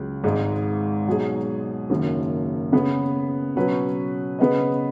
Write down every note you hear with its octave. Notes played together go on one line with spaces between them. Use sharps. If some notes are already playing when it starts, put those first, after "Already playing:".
Already playing: C#2 F#3
G#1 G#2 G#3 D#4
B2 F#3 D#4 G#4
F#1 F#2 D#3
C#3 B3 G#4 B4
B2 F#3 C#4 B4
C#3 B3 G#4 B4 D#5